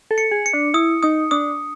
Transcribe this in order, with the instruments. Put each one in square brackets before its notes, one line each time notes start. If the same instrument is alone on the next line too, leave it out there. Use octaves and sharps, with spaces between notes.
[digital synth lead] A4
[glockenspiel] C#7
[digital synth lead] G#4
[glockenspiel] C#7
[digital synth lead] D4
[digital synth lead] E4 [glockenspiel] D#6
[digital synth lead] D#4 [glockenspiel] D#6
[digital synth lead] D4 [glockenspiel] D#6